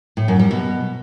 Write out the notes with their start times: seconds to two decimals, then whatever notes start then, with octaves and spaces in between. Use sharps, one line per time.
0.17 A2
0.28 F#2
0.39 G3
0.51 B2